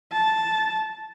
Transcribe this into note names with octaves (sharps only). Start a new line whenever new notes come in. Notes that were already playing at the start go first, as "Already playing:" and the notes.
A5